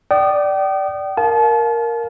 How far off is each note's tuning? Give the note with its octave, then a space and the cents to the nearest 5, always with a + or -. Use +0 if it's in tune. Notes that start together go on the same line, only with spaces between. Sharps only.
D5 +0 G5 -35 D#6 -25
A#4 +0 F5 +15 A5 -35